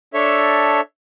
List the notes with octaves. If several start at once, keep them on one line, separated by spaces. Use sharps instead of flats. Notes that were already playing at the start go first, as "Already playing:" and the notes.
D4 A4 C#5 E5